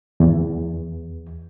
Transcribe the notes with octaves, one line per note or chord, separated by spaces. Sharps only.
E2